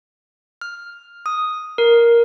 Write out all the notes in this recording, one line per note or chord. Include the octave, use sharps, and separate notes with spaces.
F6
D#6
A#4